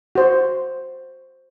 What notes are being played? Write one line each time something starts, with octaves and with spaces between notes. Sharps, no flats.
F#4 C5